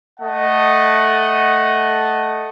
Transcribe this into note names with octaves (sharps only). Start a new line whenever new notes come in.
A3 D#5 F#5 A5